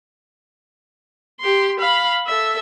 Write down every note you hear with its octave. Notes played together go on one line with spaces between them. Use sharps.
G4 C6
F5 B5
A4 E5